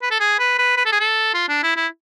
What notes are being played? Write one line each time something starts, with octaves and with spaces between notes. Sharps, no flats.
B4
A4
G#4
B4
B4
B4
A4
G#4
A4
F4
D4
E4
E4